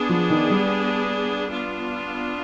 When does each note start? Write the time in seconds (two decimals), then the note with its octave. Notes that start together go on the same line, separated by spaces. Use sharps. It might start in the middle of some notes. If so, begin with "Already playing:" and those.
Already playing: B3 D4 G#4
0.09 F3
0.30 D#3
0.50 G3
1.51 B3 D4 F4